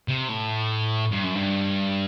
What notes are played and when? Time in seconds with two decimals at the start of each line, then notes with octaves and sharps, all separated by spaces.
0.08 C3
0.29 A2
1.12 G2
1.24 F#2
1.35 G2